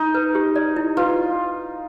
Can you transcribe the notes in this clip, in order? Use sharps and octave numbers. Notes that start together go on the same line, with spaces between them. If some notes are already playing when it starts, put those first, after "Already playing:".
Already playing: D#4
B4
G4
D5
E4
F4 B4